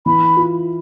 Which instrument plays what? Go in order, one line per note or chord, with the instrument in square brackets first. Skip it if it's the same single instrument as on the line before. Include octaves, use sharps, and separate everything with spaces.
[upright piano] E3 [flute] B5
[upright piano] F4